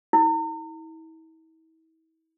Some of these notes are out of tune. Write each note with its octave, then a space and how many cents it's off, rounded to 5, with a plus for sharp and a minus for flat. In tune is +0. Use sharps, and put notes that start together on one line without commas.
E4 -40